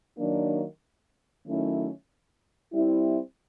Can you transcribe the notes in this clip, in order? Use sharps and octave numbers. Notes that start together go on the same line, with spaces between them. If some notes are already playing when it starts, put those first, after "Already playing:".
D#3 F#3 A#3 D4
D#3 F#3 A3 C#4 E4
G3 C4 E4